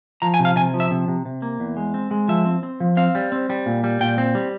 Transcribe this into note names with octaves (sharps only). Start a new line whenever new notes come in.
F3 A#5
G#5
C3
F5
C3 G#5
F3
E5
C3
C3
C3
A#3
E2
G#3
C4
G#3
F3 E5
C4
C4
F3
C4 F5
G3
C4
G3
A#2
G3
A#2 G5
C4
G3